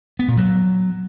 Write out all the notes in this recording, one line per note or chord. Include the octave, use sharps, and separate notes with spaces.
B3
A#2
F#3